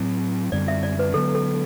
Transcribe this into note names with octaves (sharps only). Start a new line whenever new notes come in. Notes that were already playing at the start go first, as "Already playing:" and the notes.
Already playing: A2 F#3 C4
F#2 D3 G3 C4 D5
E5
D5
B4
D3 F#3 B3 A4
A4